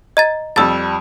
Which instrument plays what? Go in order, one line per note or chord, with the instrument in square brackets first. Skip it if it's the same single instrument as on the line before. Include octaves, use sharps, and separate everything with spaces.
[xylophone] D#5 A#5 A6
[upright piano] F2 G3 [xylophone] E6 A6